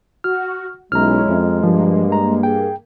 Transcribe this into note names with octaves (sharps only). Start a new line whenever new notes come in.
F#4 F6
B1 G#3 C#4 E4 A#5 F6
F2
G2 F3 A#3
A#5
G#4 G5